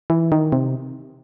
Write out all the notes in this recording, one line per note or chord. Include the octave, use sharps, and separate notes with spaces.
E3
D#3
C3